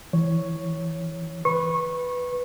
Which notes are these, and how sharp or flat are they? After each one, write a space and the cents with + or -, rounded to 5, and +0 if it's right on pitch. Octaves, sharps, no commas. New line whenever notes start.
E3 +0 C#5 +0
B4 +0 C#6 -25